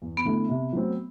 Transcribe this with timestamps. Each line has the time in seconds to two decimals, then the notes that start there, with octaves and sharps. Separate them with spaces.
0.02 E2
0.17 B3
0.25 D3 A3 E4 A4
0.49 C3
0.73 F#3 A3 C4